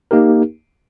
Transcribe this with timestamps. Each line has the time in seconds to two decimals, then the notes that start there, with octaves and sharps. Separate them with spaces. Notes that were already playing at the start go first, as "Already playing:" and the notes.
0.11 A#3 D#4 G4 A#4